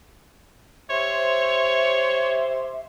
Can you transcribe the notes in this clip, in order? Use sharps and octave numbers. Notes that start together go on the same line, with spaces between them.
G4 C5 C#5 E5